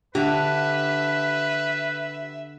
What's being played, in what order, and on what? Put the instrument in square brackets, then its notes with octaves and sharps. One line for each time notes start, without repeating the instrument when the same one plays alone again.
[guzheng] D3 [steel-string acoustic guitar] G4 [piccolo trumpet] B4 [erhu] E5